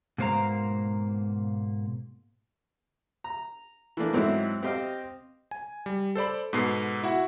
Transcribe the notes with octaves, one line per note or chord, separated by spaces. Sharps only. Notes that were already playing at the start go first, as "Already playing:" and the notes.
G#2 B2 A#3 C5 F5 A#5
A#5
E3 A3 A#3 D4
G#2 F#3 C4 D#4 E4
C4 G4 C5 D#5 F5 G5
G#5
G3
A4 C5 D5 B5
G#2 B2 B3 A4 C7
E4 F#4 F#5